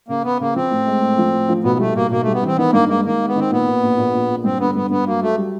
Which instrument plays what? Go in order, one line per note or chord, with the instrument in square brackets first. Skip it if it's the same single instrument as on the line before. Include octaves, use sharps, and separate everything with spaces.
[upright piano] C#3 [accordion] A#3
[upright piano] C#3 [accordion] B3
[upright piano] C#3 [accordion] A#3
[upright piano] F3 [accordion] C4
[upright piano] A2
G#3
A2
F3
A2
F3
[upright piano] B1 [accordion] B3
[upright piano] G3 [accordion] A3
[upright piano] B1 [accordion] A#3
[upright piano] B1 [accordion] A#3
[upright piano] G3 [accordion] A3
[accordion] B3
[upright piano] E3 [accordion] C4
[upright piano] D#3 [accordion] B3
[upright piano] G2 [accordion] A#3
[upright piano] G#3 [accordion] A#3
[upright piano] D#3 [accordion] A#3
[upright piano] G#3
[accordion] B3
[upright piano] D#3 [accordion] C4
[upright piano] A#2 [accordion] B3
[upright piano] A#2
A#1
A#1
A#1
A#2
[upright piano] G2 [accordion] C4
[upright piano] D3 [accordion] B3
[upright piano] G2 [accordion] B3
[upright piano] G2 [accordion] B3
[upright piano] F#3 [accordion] A#3
[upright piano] F#3 [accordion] A3
[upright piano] G3